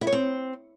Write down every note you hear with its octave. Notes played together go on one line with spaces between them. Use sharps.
E4
C#5
C4